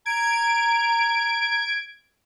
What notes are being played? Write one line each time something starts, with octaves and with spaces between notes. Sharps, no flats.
A#5 G#6 D7